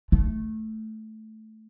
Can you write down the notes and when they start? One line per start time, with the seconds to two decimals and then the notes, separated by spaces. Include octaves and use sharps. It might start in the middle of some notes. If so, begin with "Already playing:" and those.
0.12 A3